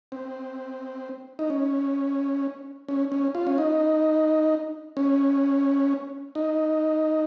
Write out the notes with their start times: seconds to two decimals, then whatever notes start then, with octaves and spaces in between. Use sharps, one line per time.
0.12 C4
1.39 D#4
1.50 C#4
2.88 C#4
3.12 C#4
3.35 F4
3.47 C#4
3.58 D#4
4.97 C#4
6.35 D#4